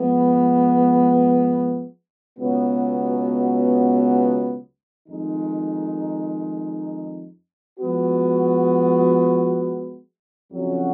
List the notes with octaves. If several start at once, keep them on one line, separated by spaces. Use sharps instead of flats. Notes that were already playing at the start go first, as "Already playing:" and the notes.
Already playing: F3 G#3 B3
C#2 B2 F#3 B3
F2 D#3 G#3 D#4
F3 G#3 B3 F#4
F2 C#3 F#3 C#4 F#4